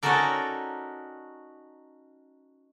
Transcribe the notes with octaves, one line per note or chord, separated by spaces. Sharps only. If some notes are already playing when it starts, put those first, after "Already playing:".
C#4 D#4 F#4 A4 A#4 D5